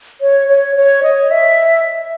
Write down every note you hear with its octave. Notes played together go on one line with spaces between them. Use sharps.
C#5
C#5
C#5
D#5
E5